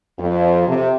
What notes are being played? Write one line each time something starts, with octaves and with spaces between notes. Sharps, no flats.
F2
C3